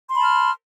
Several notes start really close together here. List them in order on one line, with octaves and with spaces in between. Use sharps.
C6 B5 A5 F6